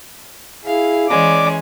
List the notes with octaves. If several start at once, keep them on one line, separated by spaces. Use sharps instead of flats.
E4 G#4 F5
E3 G#3 C#4 D5 D6